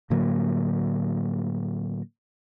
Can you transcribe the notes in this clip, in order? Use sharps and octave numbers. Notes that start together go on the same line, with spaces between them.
A2 D3 F#3 A#3